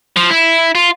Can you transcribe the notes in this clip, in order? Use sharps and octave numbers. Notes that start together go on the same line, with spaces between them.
F3
E4
F4